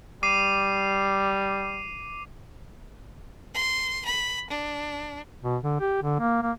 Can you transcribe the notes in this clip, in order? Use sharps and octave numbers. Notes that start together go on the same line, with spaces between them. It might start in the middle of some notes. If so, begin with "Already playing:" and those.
G3 D6 C7 D#7
C6
B5
D4
B2
D3
G4
D3
A#3
A#3